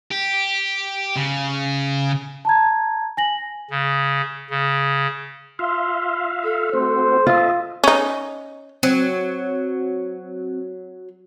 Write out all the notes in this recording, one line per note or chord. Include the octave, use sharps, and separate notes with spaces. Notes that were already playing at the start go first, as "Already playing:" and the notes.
G4
C#3
A5 A#5 G#6
G#5 A#6 F#7
C#3
C#3
F4 E5 F5 C6
A4
A3 C4 F#4 C5
F4 A4 D#5 E5
C#4 D#4
F#3 C4